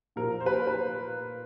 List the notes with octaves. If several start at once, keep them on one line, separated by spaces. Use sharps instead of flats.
A#2 F3 A#4
C5
B4
B4